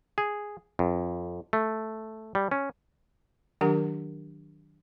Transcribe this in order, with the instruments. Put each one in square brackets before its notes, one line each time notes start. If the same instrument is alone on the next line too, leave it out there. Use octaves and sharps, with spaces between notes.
[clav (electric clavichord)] G#4
F2
A3
G3
C#4
[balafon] D#3 F#3 D4 G4 A#4 F#5